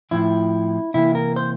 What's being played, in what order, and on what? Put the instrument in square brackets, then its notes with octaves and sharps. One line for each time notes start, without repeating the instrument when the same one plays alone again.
[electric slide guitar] A2 F3 C4 E4
C3 E3 A#3 E4
A#4
C5